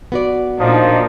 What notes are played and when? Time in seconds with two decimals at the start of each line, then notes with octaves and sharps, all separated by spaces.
0.12 B3 F#4 D5
0.60 A#2 F3 D4 D#4